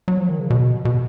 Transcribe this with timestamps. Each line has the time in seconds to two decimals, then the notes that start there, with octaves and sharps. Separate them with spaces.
0.08 F#3
0.18 F3
0.29 D#3
0.39 C#3
0.50 B2
0.85 B2